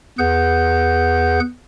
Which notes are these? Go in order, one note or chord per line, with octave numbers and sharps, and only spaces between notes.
E2 G#4 B4 F#5 G6